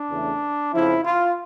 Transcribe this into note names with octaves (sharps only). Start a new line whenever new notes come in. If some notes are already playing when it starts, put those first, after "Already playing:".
Already playing: D4
E2 C#3 E3 A3
F2 C#3 F3 E4
F4